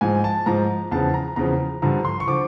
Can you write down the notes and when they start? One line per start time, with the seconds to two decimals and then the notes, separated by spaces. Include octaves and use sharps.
0.01 G#2 F3 G#5
0.24 A5
0.46 G#2 F3 A#5
0.91 E2 C#3 F3 A5
1.14 A#5
1.36 E2 C#3 F3 A#5
1.82 G2 D3 F3 A#5
2.05 C6
2.20 C#6
2.27 D3 F3 D6